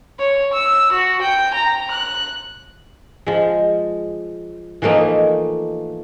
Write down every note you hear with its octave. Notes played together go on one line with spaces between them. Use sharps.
C#5
E6
F#4
G5
A#5
F#6
F3 G#3
E3 F3 A3 A#3 D#4